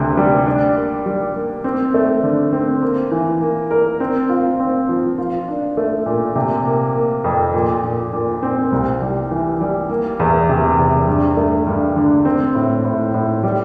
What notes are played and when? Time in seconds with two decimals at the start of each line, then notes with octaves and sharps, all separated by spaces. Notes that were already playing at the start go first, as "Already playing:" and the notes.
Already playing: D2 C3 C4
0.17 G3
0.46 D4
0.75 A#3
1.06 G3
1.35 A#3
1.64 C4
1.94 A3
2.23 D3
2.53 C4
2.82 A#3
3.11 E3
3.41 A#3
3.71 A#4
4.00 C4
4.29 F4
4.60 C4
4.89 F3
5.18 F4
5.48 D4
5.77 A3
6.06 A#2
6.36 C3
6.66 A#3
6.96 A#3
7.24 F2
7.54 A#2
7.84 A#2
8.13 A#2
8.42 C4
8.72 C2
9.01 G3
9.31 E3
9.61 G3
9.89 A#3
10.20 E2
10.49 C3
10.78 E2
11.08 G2
11.37 A3
11.67 G2
11.96 D3
12.25 C4
12.55 A2
12.84 A2
13.14 A2
13.43 G3